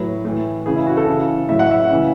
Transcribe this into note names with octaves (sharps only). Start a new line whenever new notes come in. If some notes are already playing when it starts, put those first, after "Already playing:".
Already playing: A2 F#3 B4
A2 E3
C#3 E3 G#4
E4
F#4
A4
C#3 E3
A2 F#3 E5
F#5
E5
C#3 E3